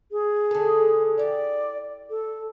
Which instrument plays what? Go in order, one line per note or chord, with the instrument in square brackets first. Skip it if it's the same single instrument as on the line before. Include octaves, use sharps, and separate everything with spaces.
[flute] G#4
[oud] D3 A4
[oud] E4 G4 [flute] D5
[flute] A4